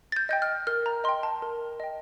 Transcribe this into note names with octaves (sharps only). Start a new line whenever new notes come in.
A6
G6
D#5 G5 G6
F6
A#4 F6
A#5
D#5 G5 C6
A5
A#4
D#5 G5